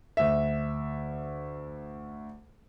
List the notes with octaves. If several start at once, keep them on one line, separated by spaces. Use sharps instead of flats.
D2 E5